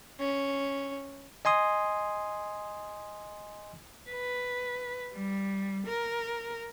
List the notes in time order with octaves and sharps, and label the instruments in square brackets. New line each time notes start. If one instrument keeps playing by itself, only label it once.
[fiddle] C#4
[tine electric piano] D#5 G#5 C6 D#6
[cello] B4
G3
A#4